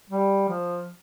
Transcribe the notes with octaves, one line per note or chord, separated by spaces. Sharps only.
G3
F3